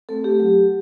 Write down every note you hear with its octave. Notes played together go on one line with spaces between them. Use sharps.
A3 C4 A4
G4
F#3 G4